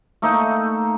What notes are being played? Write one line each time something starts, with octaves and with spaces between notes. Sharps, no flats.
A3 A#3 D#4 A4